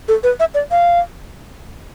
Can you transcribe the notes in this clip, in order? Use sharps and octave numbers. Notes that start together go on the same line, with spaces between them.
A4
B4
E5
D5
F5